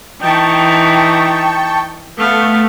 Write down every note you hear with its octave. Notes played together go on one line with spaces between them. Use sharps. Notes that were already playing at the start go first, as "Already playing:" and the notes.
E3 D#4 G5 A5 C#6
A3 B3 F5